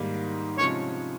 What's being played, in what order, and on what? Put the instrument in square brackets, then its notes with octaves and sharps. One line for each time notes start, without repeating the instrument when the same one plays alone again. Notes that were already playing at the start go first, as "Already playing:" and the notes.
Already playing: [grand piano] G#2 D#3 G3 A#3
[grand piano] C3 F3 G#3 C#4 [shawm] C#5